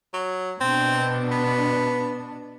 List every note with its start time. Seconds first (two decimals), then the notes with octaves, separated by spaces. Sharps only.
0.14 F#3
0.61 B2 C4 D4
1.31 B3